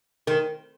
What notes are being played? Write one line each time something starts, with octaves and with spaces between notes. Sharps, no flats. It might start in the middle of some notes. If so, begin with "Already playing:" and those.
D#3